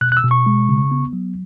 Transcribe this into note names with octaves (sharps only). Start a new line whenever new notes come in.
B2 F#6
F#6
E6
B2
C#6
G#3
C#3
B3
F#3